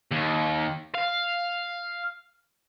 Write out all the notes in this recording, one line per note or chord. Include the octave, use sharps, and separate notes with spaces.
D#2
F5